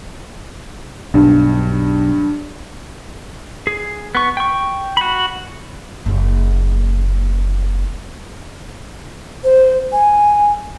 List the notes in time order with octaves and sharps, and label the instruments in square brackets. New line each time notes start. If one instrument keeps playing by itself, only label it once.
[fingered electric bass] B1 [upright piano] G2
[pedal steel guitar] G#4
B3 C#6
G5 C#6
F#4 B5
[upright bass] F#1 A#3
[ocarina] C5
G#5